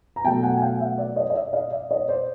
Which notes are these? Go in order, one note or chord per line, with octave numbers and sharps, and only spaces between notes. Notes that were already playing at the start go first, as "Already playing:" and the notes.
A#5
B2 F#3 A3 G5 A5
F#5 G#5
G#5
F5 G5
E5 F#5
D5 E5
C#5 D#5
D#5
D5 E5
D#5 F5
D5 E5
C#5 D#5
C5 D5